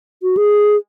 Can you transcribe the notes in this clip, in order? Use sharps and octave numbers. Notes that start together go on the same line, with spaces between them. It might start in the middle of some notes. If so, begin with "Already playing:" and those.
F#4
G#4